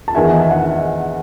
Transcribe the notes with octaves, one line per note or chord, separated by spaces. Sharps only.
A5
E2 D#3 E5 G#5
D#5
E5
F#5